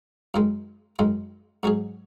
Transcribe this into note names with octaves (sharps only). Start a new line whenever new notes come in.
F#2 D#3 G#3
F#2 D#3 G#3
G#2 F#3 C#4 G#4